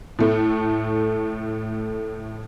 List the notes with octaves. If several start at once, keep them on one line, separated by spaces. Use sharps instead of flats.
A2 A3